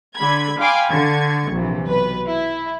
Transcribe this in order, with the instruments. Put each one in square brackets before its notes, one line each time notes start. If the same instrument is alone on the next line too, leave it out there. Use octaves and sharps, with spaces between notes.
[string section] D3 B5 G#6
F5 G5 G#5 B5 C6 D6
D3 C#6 G#6
A#1 C3 E3
B1 B4
E4